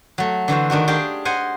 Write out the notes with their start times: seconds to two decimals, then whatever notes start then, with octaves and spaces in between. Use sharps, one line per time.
0.18 F#3 A3
0.48 D3 E3 F#4 C5
0.70 D#3 D4 D#4 F#4
0.87 D4 G4 G#4 F5 G5
1.25 C5 D#5 F#5 G#5